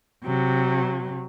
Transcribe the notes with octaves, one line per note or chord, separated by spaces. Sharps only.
C3 F#3